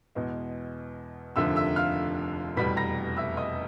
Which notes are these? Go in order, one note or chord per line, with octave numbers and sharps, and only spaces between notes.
E2 B2 G#3
F1 D#2 D3 F3 E5 E6
E5 E6
F5 F6
F1 E2 B2 G3 B5 B6
A#5 A#6
E5 E6
D#5 D#6